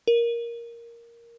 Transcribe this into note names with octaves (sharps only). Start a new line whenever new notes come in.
A#4